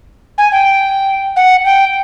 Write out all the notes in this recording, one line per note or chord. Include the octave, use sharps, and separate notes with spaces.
G#5
G5
F#5
G5